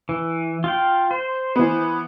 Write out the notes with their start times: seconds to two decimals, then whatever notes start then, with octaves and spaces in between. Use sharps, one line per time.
0.09 E3
0.64 F4 F5 G5
1.11 C5
1.56 E3 B3